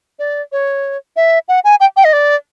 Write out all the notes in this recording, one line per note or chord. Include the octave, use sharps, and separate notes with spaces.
D5
C#5
E5
F#5
G#5
G5
G5
D#5
D5